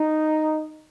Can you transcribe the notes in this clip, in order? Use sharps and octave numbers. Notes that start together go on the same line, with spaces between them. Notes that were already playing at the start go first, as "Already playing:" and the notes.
Already playing: D#4